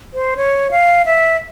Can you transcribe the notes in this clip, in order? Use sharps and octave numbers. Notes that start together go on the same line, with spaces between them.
C5
C#5
F5
E5